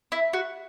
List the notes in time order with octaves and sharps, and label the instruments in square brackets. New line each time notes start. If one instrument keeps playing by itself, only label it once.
[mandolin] E4
F#4